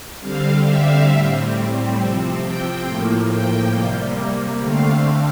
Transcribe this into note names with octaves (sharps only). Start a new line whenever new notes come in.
D3 G3 C4 F5
E5
A2 G3 C4
C3 F3 C4
G5
A2 F3 A#3
G5
C3 G3 A#3
D3 A3 C4 F5